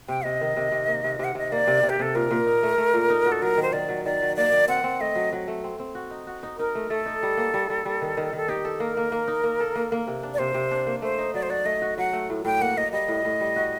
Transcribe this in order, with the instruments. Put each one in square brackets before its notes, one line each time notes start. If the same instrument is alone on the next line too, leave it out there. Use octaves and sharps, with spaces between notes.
[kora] C3 [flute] G5
[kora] C3 [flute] D#5
[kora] D#3
C3
C3
A#3
C3
[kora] C3 [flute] F#5
[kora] C3 [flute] D#5
[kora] A#3 [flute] D5
[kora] C3
C3
[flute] G4
[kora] C3 [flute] A4
[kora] A#2 [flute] A#4
[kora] A#2
D#4
A3
A3
A#2
D#4
F#4
[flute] A4
[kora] F#3 [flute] A#4
[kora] D#3
[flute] C5
[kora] D#3 [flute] D5
[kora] F#3
[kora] D#3 [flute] D5
[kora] F#3
[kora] A#3 [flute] D5
[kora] D#3
[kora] C4 [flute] F#5
[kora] C4
[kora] A3 [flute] D#5
[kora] F#3
F#3
A3
C4
C4
F#4
D#4
F#4
D#4
[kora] D#4 [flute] A#4
[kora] A3
[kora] A3 [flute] A4
[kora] D#4
G3
A#3
G3
G3
G3
D#3
D#3
[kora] D#3 [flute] A4
[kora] D#4 [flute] G4
[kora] A4
[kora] A#3 [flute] A#4
[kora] A#3
A#3
D#4
A#3
A4
A#3
A#3
C3
D4
[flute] D5
[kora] C3 [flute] C5
[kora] C3
D4
A#3
[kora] A3 [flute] C5
[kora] D#4
[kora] F#3 [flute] D5
[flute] C5
[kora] F#4 [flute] D5
[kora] A3 [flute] D#5
[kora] F#4
[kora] F#3 [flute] F#5
[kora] A3
A2
[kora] A2 [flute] G5
[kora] A#3 [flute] F#5
[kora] A#3 [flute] D#5
[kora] G3 [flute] D#5
[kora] A2
A2
G3
F#4